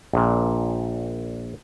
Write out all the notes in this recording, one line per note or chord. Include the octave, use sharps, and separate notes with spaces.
A#1 A#2